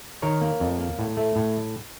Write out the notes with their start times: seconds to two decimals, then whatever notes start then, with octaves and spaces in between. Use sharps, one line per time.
0.22 D#3 A#4 C#5
0.41 A#3
0.60 F2
0.79 A#3
0.99 A2
1.17 A3
1.36 A2